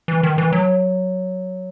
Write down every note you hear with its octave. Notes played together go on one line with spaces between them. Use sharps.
E3
D#3
E3
F#3